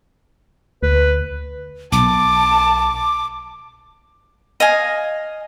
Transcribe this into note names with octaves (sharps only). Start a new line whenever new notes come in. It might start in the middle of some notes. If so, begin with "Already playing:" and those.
D2 B4
B1 A5 D6
D#5 F5 G#5